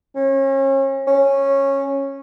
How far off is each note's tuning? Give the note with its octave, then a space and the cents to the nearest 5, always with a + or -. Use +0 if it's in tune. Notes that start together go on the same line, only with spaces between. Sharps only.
C#4 -35
C#4 -10